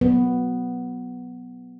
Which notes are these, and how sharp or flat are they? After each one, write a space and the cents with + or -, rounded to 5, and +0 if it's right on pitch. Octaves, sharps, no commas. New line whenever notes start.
F#3 +0 B3 +0